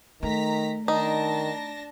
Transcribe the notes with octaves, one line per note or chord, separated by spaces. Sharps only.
D#3 A3 A#5 B6
D#3 D4 D#4 A5 A#6